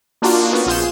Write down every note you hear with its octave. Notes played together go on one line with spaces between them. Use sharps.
A#3 D4 D#4 F4 F#4
B3 C#4 F#4
A#1 F4 G#4 C6 G6 E7